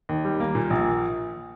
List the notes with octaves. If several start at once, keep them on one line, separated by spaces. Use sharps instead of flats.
D#2
G3
A#3
A#2
A#1